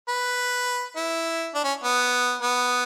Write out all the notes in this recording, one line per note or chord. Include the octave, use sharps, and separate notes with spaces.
B4
E4
D4
C#4
B3
B3